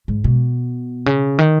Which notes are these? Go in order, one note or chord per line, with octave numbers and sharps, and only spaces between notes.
G#2
B2
C#3
D#3